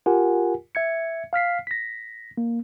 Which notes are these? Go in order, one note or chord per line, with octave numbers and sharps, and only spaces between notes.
F4 G4 A#4 F#5 G#5
E5 G#6 C#7
F5 F6 B6 C7
A#6 B6
A#3